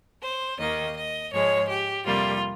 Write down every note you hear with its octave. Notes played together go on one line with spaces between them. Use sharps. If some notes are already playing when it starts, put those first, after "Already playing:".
C5
D#2 D#3 A#3 D#5
D#5
G#2 F3 G#3 C#5
G4
F2 C3 G3 A#3 F4